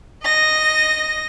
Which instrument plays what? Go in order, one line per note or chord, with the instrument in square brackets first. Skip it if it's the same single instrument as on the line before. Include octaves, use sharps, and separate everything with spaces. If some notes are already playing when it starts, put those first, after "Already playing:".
[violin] D#5 A#6